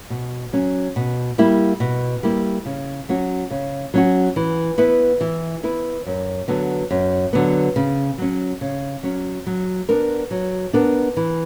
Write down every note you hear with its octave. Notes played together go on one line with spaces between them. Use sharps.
B2
F#3 C#4
B2
G3 A#3 E4
B2
G3 A#3 E4
C#3
F#3 C#4 F#4
C#3
F#3 C#4 F#4
E3
B3 E4 B4
E3
B3 E4 B4
F#2
D3 F#3 B3
F#2
D3 F#3 B3
C#3
F#3 C#4
C#3
F#3 C#4
F#3
B3 D4 A#4
F#3
B3 D4 A#4
E3